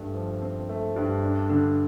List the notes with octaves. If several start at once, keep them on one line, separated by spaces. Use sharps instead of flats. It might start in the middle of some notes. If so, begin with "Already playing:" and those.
Already playing: G2 A3
F3
C4
A3
G2
D4
D3